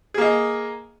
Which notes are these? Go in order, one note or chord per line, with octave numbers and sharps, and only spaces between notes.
A#3 G#4 D#5